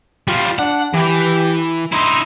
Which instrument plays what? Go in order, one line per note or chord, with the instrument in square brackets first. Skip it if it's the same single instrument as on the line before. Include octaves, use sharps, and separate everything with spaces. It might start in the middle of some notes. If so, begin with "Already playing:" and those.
[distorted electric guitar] G3 F4
[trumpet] D4 [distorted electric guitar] F#5
[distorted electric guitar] E3 [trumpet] G4
[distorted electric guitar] D#4 E4 [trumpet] C6